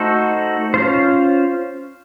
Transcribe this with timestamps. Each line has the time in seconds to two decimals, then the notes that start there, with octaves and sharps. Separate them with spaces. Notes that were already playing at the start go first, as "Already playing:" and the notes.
Already playing: A3 D#4 F#4 A4 C5
0.74 C#4 F4 C5